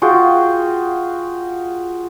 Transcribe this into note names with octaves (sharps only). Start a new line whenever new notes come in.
F4 F#4 G#4 G5